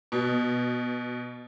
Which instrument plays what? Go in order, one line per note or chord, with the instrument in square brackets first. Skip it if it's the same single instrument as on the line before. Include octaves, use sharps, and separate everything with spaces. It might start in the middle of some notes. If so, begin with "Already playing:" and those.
[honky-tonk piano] B2